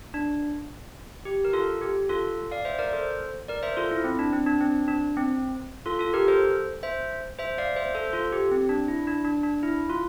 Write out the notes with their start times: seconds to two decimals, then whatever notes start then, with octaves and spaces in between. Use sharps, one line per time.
0.14 D4
1.25 G4
1.45 A#4
1.53 F4 A4
1.82 G4
2.09 F4 A4
2.51 D5 F5
2.65 C5 E5
2.79 A#4 D5
2.93 A4 C5
3.48 A#4 D5
3.63 C5 E5
3.77 F4 A4
3.91 E4
4.04 C4
4.19 D4
4.33 C4
4.47 D4
4.61 C4
4.88 D4
5.17 C4
5.86 F4 A4
5.99 F4 A4
6.13 G4 A#4
6.28 A4 C5
6.83 C5 E5
7.39 C5 E5
7.58 D5 F5
7.76 C5 E5
7.95 A4 C5
8.13 F4 A4
8.32 G4
8.51 C4
8.69 D4
8.88 E4
9.07 D4
9.25 D4
9.43 D4
9.63 E4
9.90 F4